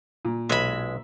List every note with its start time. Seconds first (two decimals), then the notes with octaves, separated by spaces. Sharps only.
0.25 A#2
0.49 B1 G#3 E5 B5